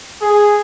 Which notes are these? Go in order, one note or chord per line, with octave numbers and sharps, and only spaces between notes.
G#4